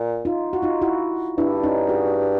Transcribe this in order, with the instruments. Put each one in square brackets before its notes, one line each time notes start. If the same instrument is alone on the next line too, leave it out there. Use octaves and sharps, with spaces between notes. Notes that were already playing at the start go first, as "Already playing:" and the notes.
Already playing: [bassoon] A#2
[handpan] D#4 F4
F#4
D#4 F4
E4 F#4
[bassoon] G2 [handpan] D4 E4
[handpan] C#4 D#4
F#4 G#4